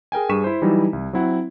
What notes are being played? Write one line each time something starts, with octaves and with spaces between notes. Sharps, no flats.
G#4 A#4 G5 G#5
G2 G#4 C#6 B6 D#7 E7
E4 C5
E3 F#3 G3 D#4 E4
C2
F#3 C4 E4 F#5